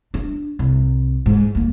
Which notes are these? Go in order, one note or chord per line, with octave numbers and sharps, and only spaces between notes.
D4
C2
G#2
D#2 A#3